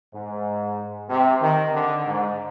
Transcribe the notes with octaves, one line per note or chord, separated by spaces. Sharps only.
G#2
C3
D#3
D3
G#2